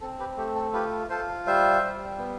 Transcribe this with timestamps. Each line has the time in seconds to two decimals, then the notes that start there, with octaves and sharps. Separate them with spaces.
0.01 C4 A4
0.20 G4 B4
0.37 A3 G4
0.55 A4
0.73 F4 G4 B4
1.10 F4 A4 C5
1.46 G3 C5 E5
1.83 G3
2.19 B3